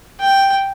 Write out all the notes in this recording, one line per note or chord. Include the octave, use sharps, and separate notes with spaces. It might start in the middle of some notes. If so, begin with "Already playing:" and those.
G5